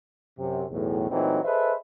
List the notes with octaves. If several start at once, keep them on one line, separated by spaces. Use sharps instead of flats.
F#2 C3
B1 E2 A2
A#2 E3 F#3 A3 C4 D#4
G#4 A4 B4 C5 D#5 E5